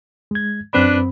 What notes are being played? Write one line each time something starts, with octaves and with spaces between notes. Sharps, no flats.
G#3 G#6
F#2 C4 D4 B4 B5